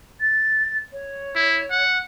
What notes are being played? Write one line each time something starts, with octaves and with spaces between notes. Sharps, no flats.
A6
C#5
E4
F#5